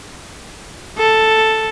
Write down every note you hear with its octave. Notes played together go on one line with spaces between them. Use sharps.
A4